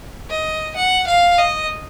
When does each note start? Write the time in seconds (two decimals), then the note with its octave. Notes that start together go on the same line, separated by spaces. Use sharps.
0.30 D#5
0.76 F#5
1.07 F5
1.38 D#5